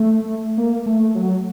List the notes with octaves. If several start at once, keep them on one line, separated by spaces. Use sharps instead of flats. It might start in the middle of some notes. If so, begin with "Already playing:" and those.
Already playing: A3
A#3
A3
F#3